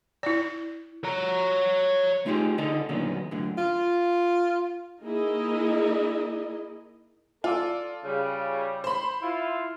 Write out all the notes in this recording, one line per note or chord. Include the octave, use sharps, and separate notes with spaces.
E4 D5
C#5 A#5
A3 D#4 F4 G4 G#4
D3 D4 D#4 G#4 A4
A#2 D3 D#3 F#3 A#3 B3
F#2 A2 D3
F4
A#3 D#4 E4 G#4 D#5
F4 A4 D5
C#3 G3
C5 B5
E4 F4